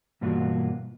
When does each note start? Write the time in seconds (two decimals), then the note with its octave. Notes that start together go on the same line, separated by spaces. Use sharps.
0.21 G2 B2 E3 A#3 F4 F#4